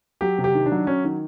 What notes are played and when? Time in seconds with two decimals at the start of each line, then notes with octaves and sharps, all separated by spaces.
0.21 F#3 G4
0.38 C3
0.44 G4
0.55 D#3
0.66 D4
0.72 F#3
0.87 F#3 C#4
1.04 D#3